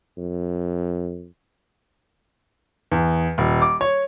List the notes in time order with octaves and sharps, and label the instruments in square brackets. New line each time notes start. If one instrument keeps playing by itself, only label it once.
[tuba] F2
[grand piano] E2
D#1
D6
C#5